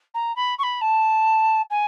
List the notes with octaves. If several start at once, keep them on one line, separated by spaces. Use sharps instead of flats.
A#5
B5
C#6
B5
A5
G#5